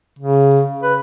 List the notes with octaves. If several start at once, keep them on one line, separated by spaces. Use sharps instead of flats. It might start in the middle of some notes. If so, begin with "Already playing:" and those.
C#3
B4